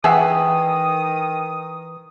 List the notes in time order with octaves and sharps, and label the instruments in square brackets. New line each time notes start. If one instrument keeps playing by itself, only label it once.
[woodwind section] D#3 D#6 [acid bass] E3 [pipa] G#4 E5 F#5 [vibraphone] G5